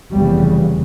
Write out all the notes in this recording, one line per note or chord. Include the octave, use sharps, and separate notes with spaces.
F1 E2 C#3 G3